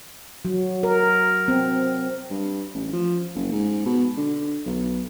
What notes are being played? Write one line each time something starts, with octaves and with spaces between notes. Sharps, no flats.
F#3
A#4
C4
G2
A1
F3
F#1
G#2
B2
D3
B1